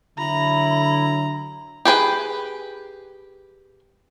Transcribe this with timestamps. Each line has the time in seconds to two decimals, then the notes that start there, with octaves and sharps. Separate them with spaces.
0.18 D3 F#3 E4 A#5 B5
1.85 G4 G#4 B4 G5